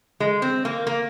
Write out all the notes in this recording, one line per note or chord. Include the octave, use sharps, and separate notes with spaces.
G#3
C4
A#3
A#3